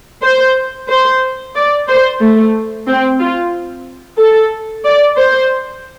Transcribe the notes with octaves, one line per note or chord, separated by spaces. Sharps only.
C5
C5
D5
C5
A3
C4
F4
A4
D5
C5